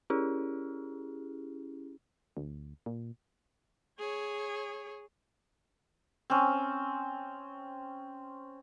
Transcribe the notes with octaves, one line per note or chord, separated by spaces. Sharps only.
C#4 E4 G4 G#4
D2
A#2
G#4 C#5
C4 C#4